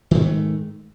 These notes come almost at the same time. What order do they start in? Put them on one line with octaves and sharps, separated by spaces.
D#3 G#2 G#3 A3